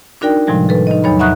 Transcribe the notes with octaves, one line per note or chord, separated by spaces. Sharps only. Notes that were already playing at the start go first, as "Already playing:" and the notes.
D4 D#4 F#4 A#4 D5 G5
A2 C3 D#3 F3 G3 G#3
A4 B4
D#4 D#5
E2 F#3 D#4 C#5 B5
E5 F#5 A#5 C#6 D#6 F#6